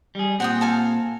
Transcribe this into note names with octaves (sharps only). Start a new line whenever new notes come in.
G3 G#4
A#2 C4 F#5 G5 D#6
A4 F5 G#5